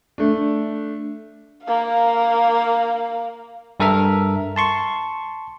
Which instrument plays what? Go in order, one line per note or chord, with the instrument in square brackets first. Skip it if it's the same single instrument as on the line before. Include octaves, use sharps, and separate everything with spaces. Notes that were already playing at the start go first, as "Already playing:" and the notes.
[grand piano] A3 D4
[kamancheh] A#3 F5
[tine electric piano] G2 A4 A#4 E5 F6
A5 C6 C#6